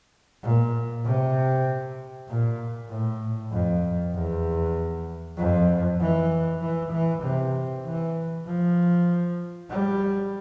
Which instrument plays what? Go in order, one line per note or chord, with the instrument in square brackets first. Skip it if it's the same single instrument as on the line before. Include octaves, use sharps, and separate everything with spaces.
[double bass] A#2
C3
A#2
A2
F2
E2
F2
E3
E3
E3
C3
E3
F3
G3